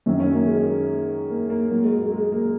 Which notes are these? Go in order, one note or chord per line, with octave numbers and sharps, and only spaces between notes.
F#2 D#3 F#3 C#4
C#4
A#3
G#3
A#3
A#3
A#2 F#3 A#3
G#3
G#3
G#3
A#3